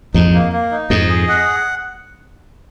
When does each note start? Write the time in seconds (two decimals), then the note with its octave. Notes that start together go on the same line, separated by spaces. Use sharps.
0.14 F2 G#2 D#4
0.34 A#3
0.53 A#3
0.71 D#4
0.90 F2 G#2 D#5
1.09 G#4
1.29 F#5